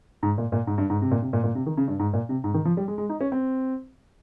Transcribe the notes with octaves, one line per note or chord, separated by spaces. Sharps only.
G#2
A#2
A#2
G#2
G2
G#2
C3
A#2
C3
A#2
A#2
C3
D#3
C#3
G2
G#2
A#2
C3
G#2
D#3
F3
G3
G#3
G#3
D#4
C#4
C4